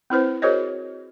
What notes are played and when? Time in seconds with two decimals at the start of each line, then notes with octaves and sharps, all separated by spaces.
0.10 C4 E4 B4 C5
0.42 F#4 G#4 A#4 C5 C#5 D#5